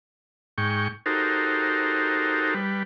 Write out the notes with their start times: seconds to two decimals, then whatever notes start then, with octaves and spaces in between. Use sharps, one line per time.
0.58 G#2 G5 C#6
1.06 D#4 F#4 G4 A4 A#4 C5
2.54 G3 B4